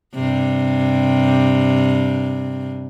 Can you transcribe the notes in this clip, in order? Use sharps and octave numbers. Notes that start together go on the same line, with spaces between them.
G2 C3